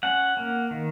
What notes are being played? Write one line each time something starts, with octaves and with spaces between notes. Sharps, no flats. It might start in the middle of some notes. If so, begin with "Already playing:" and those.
C#4 F#5
A#3
D#3